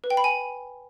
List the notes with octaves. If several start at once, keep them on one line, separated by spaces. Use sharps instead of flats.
B4
G5
B5
G#5